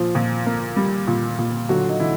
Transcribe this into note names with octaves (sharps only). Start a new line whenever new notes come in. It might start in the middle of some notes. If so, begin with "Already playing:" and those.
Already playing: A#2 F3 F4
A#2
A#3
G3
A#2
A#2
D3 F#3 F#4
D#4
D3 E3 E4